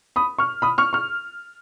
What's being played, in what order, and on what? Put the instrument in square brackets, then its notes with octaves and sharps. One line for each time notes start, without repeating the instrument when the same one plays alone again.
[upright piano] B5 D#6
C#6 F6
B5 D#6
C#6 F6
C#6 F6